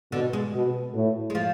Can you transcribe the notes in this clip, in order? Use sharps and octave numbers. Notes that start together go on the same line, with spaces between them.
B2 D3
G#3
B2
A2
G#3
F3